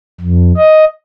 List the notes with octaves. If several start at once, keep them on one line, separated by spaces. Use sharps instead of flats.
F2
D#5